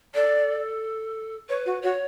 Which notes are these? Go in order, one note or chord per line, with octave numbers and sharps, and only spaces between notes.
A4 D5
B4 C#5
F#4
F#4 C#5